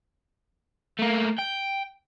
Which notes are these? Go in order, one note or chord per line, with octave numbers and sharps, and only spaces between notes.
A3 A#3
G5